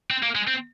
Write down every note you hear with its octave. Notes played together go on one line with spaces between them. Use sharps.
C4
A#3
G#3
C4